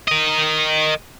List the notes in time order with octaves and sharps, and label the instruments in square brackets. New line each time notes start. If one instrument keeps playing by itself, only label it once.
[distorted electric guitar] A#4 D#5